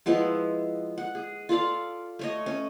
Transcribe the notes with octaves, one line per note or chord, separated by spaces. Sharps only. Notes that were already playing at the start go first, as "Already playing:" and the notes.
F3 G#3 B3 E4
F#5
G#4
F4 A4 D5 F5
A3 C#5 D#5
C#4